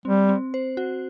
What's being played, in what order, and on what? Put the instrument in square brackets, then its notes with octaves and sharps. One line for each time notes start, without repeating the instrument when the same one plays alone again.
[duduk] G3 [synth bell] C4
[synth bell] C4
C5
F#4